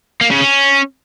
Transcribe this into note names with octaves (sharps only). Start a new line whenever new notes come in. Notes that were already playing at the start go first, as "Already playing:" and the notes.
A#3
C#3
C#4